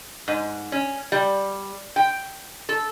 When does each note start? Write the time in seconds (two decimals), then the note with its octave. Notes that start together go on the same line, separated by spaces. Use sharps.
0.28 G#2
0.72 C#4
1.12 G3
1.96 G5
2.69 A4